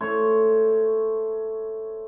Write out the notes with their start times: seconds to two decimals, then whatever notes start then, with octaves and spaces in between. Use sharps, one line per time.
0.01 A3 C5 C#5